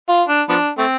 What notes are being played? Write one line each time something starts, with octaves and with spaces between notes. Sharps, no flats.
F4
D4
F3 B3 D4
A3 C4